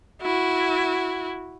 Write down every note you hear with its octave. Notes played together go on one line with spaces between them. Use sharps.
E4 F#4